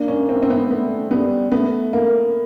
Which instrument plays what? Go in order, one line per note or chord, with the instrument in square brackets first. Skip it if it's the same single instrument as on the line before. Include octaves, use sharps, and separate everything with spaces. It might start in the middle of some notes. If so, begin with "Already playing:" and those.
Already playing: [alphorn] A#3 [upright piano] D4
[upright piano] C#4
C4
C4
B3
[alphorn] A3 [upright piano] B3
[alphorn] G3 [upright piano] B3
[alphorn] A3 [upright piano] B3
[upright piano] A#3